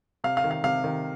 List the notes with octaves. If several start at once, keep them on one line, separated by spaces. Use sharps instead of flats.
C3 F5
F5
D#3
F5
C3 F5
D#3